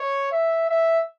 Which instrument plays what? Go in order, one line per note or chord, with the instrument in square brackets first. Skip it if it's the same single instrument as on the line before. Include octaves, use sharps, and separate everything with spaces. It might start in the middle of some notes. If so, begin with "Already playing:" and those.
Already playing: [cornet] C#5
E5
E5